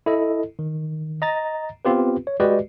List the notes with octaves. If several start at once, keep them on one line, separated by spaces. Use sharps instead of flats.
E4 A4 D#5
D#3
D#5 A#5 A6
B3 C4 F4 G4 B4
C#5
G#3 F#4 G4 B4 D5 D#5